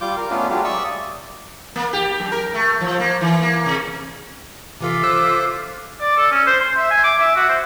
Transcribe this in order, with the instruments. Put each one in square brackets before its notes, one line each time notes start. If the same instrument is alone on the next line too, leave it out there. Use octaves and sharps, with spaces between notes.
[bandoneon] G3 F4 D6 G6
A#4
A3 B3 C#4 D4 F4
F#3 G#3 A3 D4 F4 G4
D5 E5 C#6 D#6 E6
[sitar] A#3
G4
F#2
A#4
A3
F3
A#3
E3
A#3
C3
[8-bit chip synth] C3 E3 A4 [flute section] F4 E5 D6
[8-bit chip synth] A4 C5 F#6 [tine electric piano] E6
[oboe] D5
A4
C#4
C5
C6
E5
G#5
D6
E5
F#4
C5